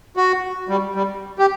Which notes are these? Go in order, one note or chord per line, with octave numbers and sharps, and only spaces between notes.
F#4
G3
G3
G4